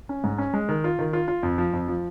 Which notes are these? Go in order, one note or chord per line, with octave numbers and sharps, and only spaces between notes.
C#4
G#2
C#4
G#3
D#3
F4
D#3
F4
F4
F2
F3
F2
F3